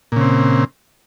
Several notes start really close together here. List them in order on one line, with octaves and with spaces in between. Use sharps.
A#2 C#3 C4